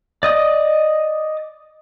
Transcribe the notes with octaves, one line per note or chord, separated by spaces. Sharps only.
D5 D#5 D#6